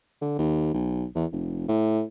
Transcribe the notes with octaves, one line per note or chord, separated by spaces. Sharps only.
D3
D#2
B1
E2
F1
A2